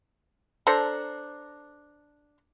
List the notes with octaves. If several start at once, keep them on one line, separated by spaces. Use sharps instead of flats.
D4 A4 C5 A#5